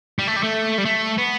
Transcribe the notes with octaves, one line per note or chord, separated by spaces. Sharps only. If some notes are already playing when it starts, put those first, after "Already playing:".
G3
A3
G3
A3
G3
A3
B3